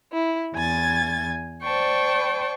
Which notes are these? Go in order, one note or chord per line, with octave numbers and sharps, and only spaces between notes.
E4
E2 G#5 G#6 A6
C5 D5 G5 A5 C#6